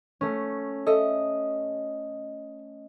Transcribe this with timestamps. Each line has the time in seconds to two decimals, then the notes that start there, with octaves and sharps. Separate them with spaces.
0.21 A3 C#4
0.86 A4 D#5 E5